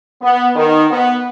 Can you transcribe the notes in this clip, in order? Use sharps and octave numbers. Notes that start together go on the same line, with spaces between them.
B3
D#3
B3